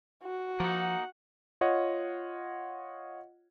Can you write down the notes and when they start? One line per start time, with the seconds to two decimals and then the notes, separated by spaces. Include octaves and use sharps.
0.23 F#4
0.60 F3 A#3 D#4 F#5
1.61 F4 C#5 D#5 F#5